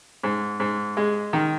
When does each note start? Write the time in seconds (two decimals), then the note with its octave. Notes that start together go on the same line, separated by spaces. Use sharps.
0.23 G#2
0.60 G#2
0.97 G#3
1.33 D#3